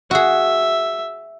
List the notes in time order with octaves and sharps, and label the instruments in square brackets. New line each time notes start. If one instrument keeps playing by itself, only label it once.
[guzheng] F#4 G#4 [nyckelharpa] E5